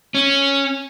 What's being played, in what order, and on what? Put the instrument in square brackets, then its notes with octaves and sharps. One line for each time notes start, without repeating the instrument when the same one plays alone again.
[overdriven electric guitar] C#4